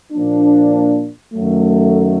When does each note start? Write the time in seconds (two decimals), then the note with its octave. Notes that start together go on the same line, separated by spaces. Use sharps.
0.12 A#2 F3 A#3 D4
1.34 F#2 D#3 F#3 A3